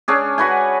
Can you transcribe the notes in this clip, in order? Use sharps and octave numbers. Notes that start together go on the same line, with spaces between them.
C#4 D4 G#4
F#4 B4 F#5 G#5